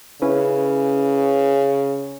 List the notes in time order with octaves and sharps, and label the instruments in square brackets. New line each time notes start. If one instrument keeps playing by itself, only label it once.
[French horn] C#3 [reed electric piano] C#4 E4 B4